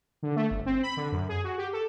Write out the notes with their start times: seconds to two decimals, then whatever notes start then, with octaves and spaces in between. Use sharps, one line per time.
0.23 D3
0.36 A3
0.51 G1
0.66 C4
0.83 B5
0.97 D3
1.12 F#2
1.29 G#4
1.44 F#4
1.58 G4
1.73 A4